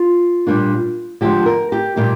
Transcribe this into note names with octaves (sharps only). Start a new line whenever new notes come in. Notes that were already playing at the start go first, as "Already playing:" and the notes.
Already playing: F4
A#2 G3 A#3 D4
D3 F3 G#3 G4
A#4
G4
A#2 G3 A#3 D#4 G4